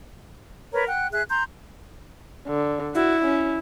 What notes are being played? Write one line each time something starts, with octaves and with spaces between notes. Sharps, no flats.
A#4 B4 C#5 A#5
F#5 G5 F#6
G#4 E5 F#6
A#5 C6 G6
D3
E4 F#4
C#4